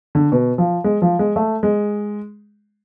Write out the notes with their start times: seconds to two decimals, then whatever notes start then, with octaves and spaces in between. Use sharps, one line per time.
0.15 D3
0.32 B2
0.58 F3
0.84 G#3
1.02 F3
1.19 G#3
1.36 A3
1.63 G#3